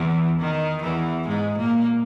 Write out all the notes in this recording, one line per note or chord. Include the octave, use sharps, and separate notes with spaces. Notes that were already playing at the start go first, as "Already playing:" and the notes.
Already playing: E2 E3
D#3
E2 E3
G#2 G#3
A#2 A#3